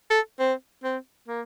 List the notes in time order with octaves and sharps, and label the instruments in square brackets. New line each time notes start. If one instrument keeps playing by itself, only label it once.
[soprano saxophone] A4
C4
C4
A#3